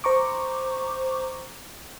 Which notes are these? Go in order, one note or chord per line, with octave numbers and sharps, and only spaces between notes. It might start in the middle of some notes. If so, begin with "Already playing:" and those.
C5 A#5 C#6 D6